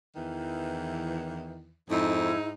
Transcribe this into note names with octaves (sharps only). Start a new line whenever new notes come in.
E2 D#3 E3
F2 G#2 D#4 E4